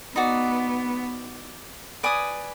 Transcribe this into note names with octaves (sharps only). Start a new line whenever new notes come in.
B3 D#4 F#4 D5
B4 D5 G#5 D#6